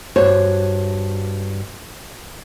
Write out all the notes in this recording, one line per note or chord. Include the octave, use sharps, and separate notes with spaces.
G2 F#4 C5 C#5